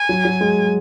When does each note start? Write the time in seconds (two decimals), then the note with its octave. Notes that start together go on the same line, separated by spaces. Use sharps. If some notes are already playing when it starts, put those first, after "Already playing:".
Already playing: G#5
0.09 F#3
0.25 F#3
0.41 G#3